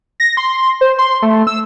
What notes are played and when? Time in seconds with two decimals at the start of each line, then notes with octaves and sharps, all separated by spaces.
0.20 A#6
0.37 C6
0.81 C5
0.99 C6
1.22 A3
1.47 E6